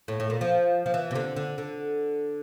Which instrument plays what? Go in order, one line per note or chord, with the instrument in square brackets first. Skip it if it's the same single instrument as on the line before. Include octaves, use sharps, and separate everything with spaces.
[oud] A2
A2
A#2
F3
F3
E3
C3
D3
D3
D3